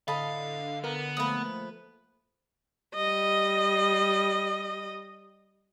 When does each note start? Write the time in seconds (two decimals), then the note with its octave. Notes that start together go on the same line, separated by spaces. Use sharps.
0.08 A2 D3 A4 D#5 F5 B5
0.84 B3 A#4
1.17 F3 A3 A#3 B4 D#6
2.95 G3 D#5